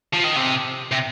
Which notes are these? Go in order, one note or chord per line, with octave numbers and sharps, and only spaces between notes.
F3
D#3
C3
C3